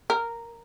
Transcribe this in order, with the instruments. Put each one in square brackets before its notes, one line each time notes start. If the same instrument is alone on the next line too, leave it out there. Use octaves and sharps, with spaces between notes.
[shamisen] A#4